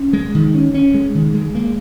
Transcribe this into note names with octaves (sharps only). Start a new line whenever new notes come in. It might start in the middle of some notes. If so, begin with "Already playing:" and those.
Already playing: C#4
G#3
D#3
C#4
C#4
G#3
D#3
G#3
A#3